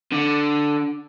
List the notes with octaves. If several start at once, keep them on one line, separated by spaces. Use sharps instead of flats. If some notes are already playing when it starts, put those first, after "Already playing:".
D3 D4